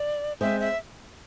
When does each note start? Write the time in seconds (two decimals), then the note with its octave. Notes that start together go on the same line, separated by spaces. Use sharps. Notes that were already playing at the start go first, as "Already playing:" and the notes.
Already playing: D5
0.41 G#3 C4 G#4 C5 E5
0.60 E5